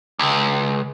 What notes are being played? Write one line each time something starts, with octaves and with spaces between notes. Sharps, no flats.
C#2